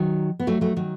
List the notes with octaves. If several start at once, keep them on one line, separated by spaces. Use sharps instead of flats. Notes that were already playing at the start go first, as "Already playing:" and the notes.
Already playing: D#3 F#3
B3
F#3 A3
F#3 A3
D#3 F#3